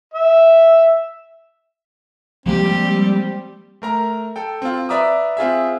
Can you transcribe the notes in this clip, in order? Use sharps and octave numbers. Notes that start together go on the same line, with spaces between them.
E5
F3 G3 G#3 A#3 C4 G4
A3 A#4 A#5
A4 G5
C4 F4
B4 D5 E5 A#5 D6 D#6
C4 F4 G#4 E5